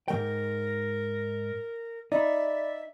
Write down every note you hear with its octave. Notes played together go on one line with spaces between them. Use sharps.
G#2 F#3 A#4 G5
D#4 D5 E5 B5